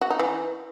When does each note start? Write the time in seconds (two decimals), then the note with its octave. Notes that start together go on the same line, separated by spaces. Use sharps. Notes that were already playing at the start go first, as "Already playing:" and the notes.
0.01 F#4
0.10 D#4
0.19 E3